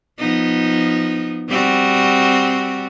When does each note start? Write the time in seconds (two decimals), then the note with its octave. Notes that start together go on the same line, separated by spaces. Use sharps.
0.19 F3 B3 D#4
1.49 G3 C4 F#4